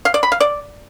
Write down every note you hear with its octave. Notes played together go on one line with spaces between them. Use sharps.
F5
D5
B5
F5
D5